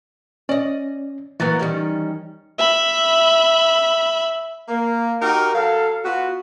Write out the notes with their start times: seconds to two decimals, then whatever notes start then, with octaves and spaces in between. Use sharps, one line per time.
0.49 C#4 D5 D#5
1.40 E3 F#3 A#3 B3 A6
1.59 D#3 G3 C#4
2.58 E5 B5
4.69 A#3
5.21 D#4 F#4 G4 A#4
5.54 F#3 A4 F5
6.04 B3 F4 F#4